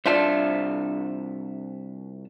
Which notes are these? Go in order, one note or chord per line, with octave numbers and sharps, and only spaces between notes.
C2 D4 F4 C5 E5 A5